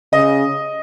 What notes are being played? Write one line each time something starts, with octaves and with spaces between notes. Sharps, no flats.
C#3 D#5